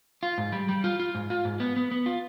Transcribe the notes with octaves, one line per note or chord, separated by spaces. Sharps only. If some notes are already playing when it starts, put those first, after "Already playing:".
F4
G#2
G3
G3
F4
F4
G#2
F4
G#2
B3
B3
B3
F4